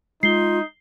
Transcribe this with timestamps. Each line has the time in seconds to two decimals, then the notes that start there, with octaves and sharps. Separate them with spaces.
0.23 G#3 D#4 F4 C7 G7